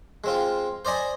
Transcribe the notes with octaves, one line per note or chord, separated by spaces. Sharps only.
G#3 C4 F4
C5 D5 D#5 G#5 B5